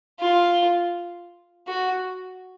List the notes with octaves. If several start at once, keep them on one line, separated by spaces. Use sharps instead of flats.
F4
F#4